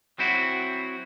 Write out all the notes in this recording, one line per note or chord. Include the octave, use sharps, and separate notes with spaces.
F#3 C4 E4 F#4